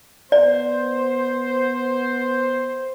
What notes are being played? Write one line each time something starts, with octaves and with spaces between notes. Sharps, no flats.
B3 C5 D5